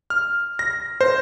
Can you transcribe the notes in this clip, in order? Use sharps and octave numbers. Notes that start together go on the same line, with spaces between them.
F6
A#6
C5